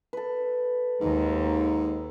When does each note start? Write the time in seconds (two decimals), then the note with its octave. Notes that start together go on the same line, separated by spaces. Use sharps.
0.13 A4 B4
1.01 D#2 G#2